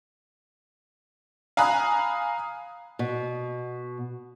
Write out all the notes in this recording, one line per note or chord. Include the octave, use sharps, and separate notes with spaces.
F5 G#5 A#5 B5 D#6 F#6
B2